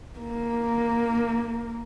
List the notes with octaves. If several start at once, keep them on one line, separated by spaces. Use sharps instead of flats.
A#3